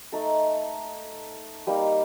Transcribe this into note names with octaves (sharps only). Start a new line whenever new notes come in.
A3 D#4 A4
G3 A#3 D#4